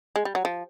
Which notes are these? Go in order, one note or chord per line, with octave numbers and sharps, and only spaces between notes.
G#3
G3
F#3
F3